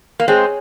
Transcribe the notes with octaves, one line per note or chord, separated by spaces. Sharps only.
A#3
G#3 C4 G#4 C#5 G#5